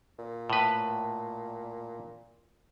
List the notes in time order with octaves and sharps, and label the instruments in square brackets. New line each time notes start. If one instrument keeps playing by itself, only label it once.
[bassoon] A#2
[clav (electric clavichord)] A2 B4